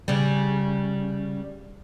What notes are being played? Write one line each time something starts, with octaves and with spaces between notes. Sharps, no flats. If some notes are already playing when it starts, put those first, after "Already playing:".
C#3 G3